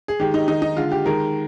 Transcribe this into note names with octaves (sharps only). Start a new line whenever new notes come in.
G#4
D#3 G#3 G4
D#4
D#3 G#3 D#4
D#4
D3 G#3 F4
G4
D#3 G#3 A#4